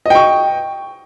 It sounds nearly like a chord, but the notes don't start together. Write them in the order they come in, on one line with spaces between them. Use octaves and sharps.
D#5 G5 C#6